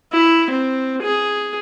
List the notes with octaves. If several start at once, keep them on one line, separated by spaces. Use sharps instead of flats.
E4
C4
G#4